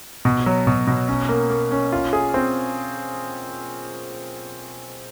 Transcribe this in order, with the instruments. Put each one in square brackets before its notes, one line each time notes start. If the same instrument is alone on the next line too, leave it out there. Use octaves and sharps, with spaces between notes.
[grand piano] B2
F#3
B2
B2
C#4
A#3
A#3
C#4
F4
G#4
C4